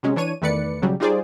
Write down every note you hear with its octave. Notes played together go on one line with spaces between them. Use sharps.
C3 F#3 G#3 C#4
E3 D4 C#5 D#7
E2 D#3 A3 B4 D5 C#7
B1 C#3 F#3 G3
G3 D#4 F4 G#4 C5 D5